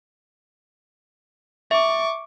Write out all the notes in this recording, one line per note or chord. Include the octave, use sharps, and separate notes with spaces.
E5 C#6 D6